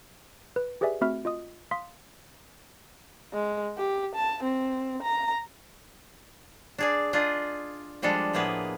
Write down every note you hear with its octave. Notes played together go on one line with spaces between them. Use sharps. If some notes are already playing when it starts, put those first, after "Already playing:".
B4
G4 G#4 B4 D5 E5 G#5
A3 C4 F#4 E5 B5 F6
F4 D#5 D#6
F5 C6 D#6 B6
G#3
G4
A5
C4
A#5
D4 G#4 D5
D4 F4 G#4 D#5
F3 G3 G#3 D4 A4
A2 F3 A#3 B3 G#4 B4